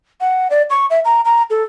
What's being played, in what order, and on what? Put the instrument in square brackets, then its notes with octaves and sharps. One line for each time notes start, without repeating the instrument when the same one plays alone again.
[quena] F#5
D5
C#6
E5
A#5
A#5
A4